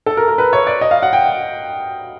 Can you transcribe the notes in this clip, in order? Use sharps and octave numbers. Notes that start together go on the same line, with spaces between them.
A4
A#4
A#4
B4
C#5
D5
D#5
F5
F#5
G5